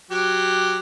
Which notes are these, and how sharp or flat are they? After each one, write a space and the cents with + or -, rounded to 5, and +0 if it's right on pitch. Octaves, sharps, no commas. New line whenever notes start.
F#3 +0 G4 +0